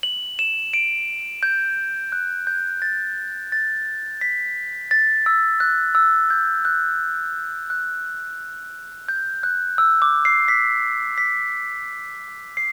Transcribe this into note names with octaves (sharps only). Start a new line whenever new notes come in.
F#7
E7
D7
G6
F#6
G6
A6
A6
B6
A6
E6
F#6
E6
G6
F#6
F#6
G6
F#6
E6
D6
C7
B6
B6
C7